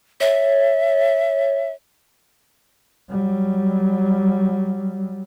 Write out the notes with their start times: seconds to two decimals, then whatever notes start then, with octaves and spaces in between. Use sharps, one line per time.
0.20 C#5 E5
3.10 F#3 G3